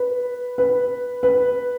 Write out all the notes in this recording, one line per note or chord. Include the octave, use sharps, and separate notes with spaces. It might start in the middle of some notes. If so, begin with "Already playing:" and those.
Already playing: B4
B4
B4